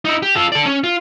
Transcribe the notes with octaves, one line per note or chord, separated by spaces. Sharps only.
D#4 E4
G4
F4 A4
A4 D5
C#4
F4